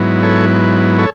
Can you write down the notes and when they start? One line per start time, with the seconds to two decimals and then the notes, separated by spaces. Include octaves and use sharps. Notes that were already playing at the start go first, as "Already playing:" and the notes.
Already playing: G#2 F#3 B3 E4
0.23 A4 C#5
0.99 A4 C#5